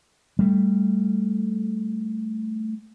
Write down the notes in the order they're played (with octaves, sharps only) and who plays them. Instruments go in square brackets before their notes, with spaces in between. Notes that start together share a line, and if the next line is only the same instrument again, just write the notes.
[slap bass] G3 A3